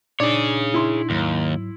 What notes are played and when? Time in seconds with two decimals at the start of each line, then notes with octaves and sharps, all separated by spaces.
0.20 A#2 D4 D#4 G#4 C#5 D5
0.74 E4 C6
1.10 D#2 G#2 F#3